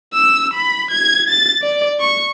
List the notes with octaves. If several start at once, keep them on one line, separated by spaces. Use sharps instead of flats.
E6
B5
G#6
A6
D5
C#6